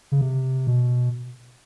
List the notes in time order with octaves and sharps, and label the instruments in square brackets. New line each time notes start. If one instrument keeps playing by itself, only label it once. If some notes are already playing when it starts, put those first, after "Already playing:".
[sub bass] C#3
C3
B2